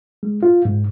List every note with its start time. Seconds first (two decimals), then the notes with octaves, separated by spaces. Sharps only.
0.23 G#3
0.43 F4
0.65 G#2